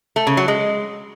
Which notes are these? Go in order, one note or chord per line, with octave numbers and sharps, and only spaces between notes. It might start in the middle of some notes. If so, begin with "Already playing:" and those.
A3
C#3
F#3
G#3